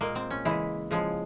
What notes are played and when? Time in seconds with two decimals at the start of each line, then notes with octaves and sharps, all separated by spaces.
0.01 A#2 G#3 A#3
0.15 C4
0.30 C#4
0.45 C#3 E3 G#3 E4
0.91 C#3 F3 G#3